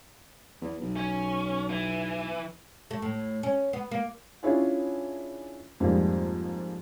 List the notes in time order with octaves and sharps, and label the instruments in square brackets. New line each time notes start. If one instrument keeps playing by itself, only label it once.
[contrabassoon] E2
B1
[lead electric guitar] C#4
E3
[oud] A3
A2
C#4
B3
A#3
[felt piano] C#4 D4 E4 F4 G#4 C#5
F2 G#2 G3 G#3 A#3 C4